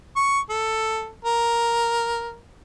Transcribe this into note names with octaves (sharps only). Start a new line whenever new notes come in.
C#6
A4
A#4